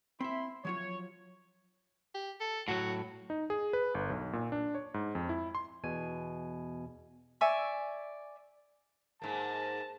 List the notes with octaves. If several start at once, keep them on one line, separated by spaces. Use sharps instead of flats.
C4 E4 E5 B5 C6
F3 F#3 F4 C#5
G4
A4
A2 F#3 F#4
D#4
G#4
B4
G1
B1
A#2
D4
C#5
G#2
F2
E4
C6
E2 B2 G#5
D5 E5 G#5 C#6
G#2 A#3 A5